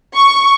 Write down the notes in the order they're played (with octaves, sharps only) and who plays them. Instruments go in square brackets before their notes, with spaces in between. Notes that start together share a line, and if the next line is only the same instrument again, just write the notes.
[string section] C#6